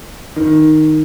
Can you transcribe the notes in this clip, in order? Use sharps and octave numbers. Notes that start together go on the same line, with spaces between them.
D#3